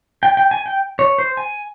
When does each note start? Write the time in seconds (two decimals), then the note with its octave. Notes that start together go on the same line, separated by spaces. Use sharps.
0.23 G5
0.37 G5
0.51 G#5
0.66 G5
0.99 C#5
1.18 C5
1.37 G#5